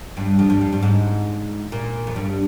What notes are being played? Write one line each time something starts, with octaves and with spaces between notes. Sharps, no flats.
G2
F2
G2
F2
G2
G#2
A#2
F2
G2